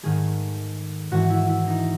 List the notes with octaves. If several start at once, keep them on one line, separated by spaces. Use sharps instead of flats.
G#2 D#3 A3 G#4
G#2 E3 A3 F#4
E4
E4
D#4